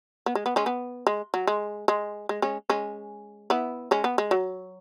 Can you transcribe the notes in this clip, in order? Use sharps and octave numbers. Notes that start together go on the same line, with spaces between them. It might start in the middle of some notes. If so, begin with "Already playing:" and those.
B3
G#3
B3
G#3 C#4
B3
G#3
F#3
G#3
G#3
G#3
G#3 C#4
G#3 C#4
B3 E4
G#3 C#4
B3
G#3
F#3